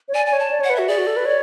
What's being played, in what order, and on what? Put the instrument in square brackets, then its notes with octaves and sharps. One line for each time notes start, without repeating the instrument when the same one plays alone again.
[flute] C#5
[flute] D5 [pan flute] G#5
[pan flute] G#5
[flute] C#5
[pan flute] A5
[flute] D5
[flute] C#5 [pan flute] F#5
[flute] B4
[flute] F#4 [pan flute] E5
[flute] G#4 [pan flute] D5
[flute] F#4
A4
B4
C#5